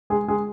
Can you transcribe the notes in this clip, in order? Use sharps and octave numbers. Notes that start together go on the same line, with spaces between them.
G#3 G#4
G#3 G#4